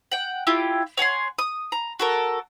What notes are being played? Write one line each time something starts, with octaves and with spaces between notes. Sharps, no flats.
F#5 G5
E4 F4 G4
C#5 F#5 G#5 C6
D#6
A#5
F#4 A4 A#4